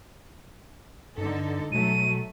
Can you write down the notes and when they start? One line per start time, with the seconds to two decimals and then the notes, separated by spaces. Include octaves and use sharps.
1.18 G2 D3 D#4 A4
1.72 B2 F#3 A3 D#7